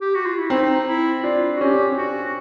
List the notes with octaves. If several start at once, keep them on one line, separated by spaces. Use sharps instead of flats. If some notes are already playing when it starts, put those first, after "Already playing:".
G4
F#4
F4
E4
C4 D#4
E4
D4 F4
F#4
C#4 G4
D4
C#4
F#4